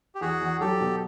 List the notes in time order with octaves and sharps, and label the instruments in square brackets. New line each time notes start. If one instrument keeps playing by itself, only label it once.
[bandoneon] G4
[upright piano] E2 [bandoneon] F#4 G#4
[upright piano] E2
[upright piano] F#3 [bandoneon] G4 A4
[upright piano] B2